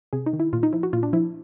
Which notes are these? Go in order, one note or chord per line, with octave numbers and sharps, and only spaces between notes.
C3 G#4
D#4
D#3
E4
A#2 F4
D#4
F3 E4
F#4
A#2 F4
D4
F3 E4